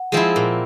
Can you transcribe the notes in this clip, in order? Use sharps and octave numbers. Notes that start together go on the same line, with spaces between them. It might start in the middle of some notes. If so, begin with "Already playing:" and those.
Already playing: F#5
F3 G#3 C4 E4
A#2